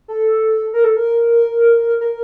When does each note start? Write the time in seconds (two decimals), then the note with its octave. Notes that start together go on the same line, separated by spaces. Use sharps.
0.08 A4
0.74 A#4
0.84 A4
0.96 A#4
2.01 A#4